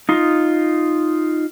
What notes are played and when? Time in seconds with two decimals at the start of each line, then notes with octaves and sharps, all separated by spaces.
0.09 D#4 F4